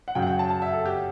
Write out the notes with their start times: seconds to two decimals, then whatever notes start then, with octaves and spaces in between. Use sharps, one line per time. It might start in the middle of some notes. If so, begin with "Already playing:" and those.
0.08 F#5
0.15 F#2 C#3 F#3 G5
0.22 F#5
0.27 G5
0.39 A5
0.50 A5
0.62 E5
0.73 A4
0.86 G4